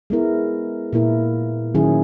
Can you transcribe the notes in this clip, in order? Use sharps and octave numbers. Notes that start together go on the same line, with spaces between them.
G#3 B3 E4 A#4
A#2 A#3 E4 A#4
D#3 F#3 C#4 E4 G#4